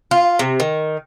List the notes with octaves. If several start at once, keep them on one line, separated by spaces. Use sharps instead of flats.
F4
C3
D#3